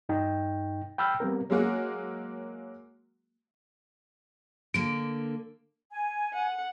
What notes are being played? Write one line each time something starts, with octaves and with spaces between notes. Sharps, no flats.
G2 D#4 G5
G5 B5 E6 F6 G6
G3 B3 C4 A#4
F#3 G#3 A#3 F#4
D3 A#3 D7
G#5
F#5